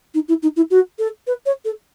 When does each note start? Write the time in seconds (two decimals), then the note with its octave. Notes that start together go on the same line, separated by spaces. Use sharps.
0.14 D#4
0.28 E4
0.42 D#4
0.56 E4
0.71 F#4
0.99 A4
1.27 B4
1.46 C#5
1.65 A4